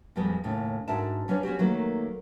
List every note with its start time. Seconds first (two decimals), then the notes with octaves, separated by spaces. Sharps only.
0.16 F2 A#2 G3 G#3 B3 C4
0.44 D#2 A2 C#3
0.88 G#2 D4 F#4 A#4 E5 A5
1.28 F#3 C#4 D4 B4 C#5
1.43 B3 C#4 F#4 G4
1.59 D#3 F#3 A3 A#3 B4